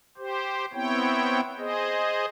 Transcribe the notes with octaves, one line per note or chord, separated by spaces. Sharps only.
G4 C5
B3 C4 E4 C#5 G5
G#4 C5 D#5